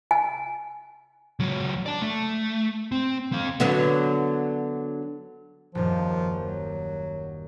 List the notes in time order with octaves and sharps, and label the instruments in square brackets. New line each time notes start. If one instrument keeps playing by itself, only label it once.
[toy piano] G#5
[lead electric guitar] C#2 F#3
D5 A5
A3
C4
C4 F5
[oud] D3 F#3 B3
[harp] D#1 F#2 [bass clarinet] F3
[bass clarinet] F#3